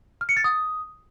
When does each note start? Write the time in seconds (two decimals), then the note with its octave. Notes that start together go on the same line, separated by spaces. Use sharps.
0.21 F6
0.29 C#7
0.37 A6
0.44 D#6